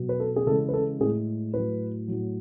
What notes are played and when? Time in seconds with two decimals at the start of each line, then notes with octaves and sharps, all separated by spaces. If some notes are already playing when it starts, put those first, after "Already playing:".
Already playing: B2 F#3
0.09 B4
0.20 A4
0.36 G#4
0.46 C#3 E3 G#3 A4
0.69 B4
0.74 A4
1.00 A2 G#3 G#4
1.54 A2 F#3 B4
2.08 A2 F#3